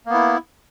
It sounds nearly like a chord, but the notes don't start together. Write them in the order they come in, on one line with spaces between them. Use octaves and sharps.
A#3 B3 E4